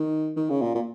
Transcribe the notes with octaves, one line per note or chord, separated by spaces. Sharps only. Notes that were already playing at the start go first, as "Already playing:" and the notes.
Already playing: D#3
D#3
C#3
A#2
A#2